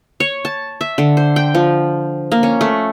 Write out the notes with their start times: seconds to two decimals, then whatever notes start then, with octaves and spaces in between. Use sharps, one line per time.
0.20 C#5
0.45 A5
0.81 E5
0.98 D3
1.17 C5
1.36 G5
1.55 F3
2.32 A#3
2.43 C#4
2.61 A3